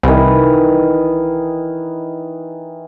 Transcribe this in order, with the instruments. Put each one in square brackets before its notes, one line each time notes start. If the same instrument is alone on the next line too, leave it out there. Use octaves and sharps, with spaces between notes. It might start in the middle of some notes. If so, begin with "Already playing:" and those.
[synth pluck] C2 [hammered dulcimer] D#3 E3